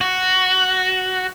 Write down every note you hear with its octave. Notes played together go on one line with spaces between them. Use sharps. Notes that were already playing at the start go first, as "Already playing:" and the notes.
F#4